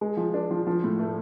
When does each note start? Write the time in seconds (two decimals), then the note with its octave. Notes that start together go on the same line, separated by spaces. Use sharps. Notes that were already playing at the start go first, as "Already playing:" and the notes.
0.01 G#3
0.17 F3
0.34 D4
0.50 F3
0.66 F3
0.84 A2
0.99 A3